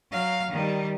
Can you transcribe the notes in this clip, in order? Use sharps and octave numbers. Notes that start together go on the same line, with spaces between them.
F#3 F5
D#3 G3